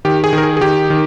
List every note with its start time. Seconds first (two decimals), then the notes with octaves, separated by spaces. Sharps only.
0.05 D#3 G4
0.24 G#4
0.33 D#3
0.38 A#4
0.43 G#4
0.57 G#4
0.61 D#3 G4
0.90 D#3